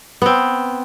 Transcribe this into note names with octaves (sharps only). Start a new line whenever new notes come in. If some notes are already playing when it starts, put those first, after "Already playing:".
B3 C4